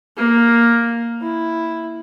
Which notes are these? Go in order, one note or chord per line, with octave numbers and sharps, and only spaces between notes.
A#3
E4